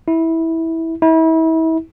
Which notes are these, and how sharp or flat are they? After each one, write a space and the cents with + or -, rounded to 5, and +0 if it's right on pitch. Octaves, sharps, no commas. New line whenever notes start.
E4 -15
E4 -35